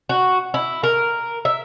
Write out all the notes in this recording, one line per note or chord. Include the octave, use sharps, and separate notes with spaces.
F#4
E4
A#4
E5